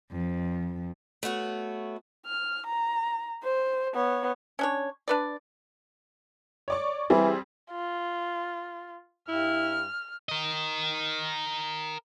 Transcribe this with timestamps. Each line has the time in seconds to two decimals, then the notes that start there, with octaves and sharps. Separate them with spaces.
0.11 F2
1.23 A3 B3 F#4 C#5
2.26 F6
2.66 A#5
3.43 C5
3.94 B3 C#5
4.59 C#4 D4 C#5
5.08 D4 B4 D5
6.68 C#5 D5 C#6
7.10 E3 G3 C4 G#4
7.72 F4
9.29 G2 E4 F6
10.29 A#4 D#5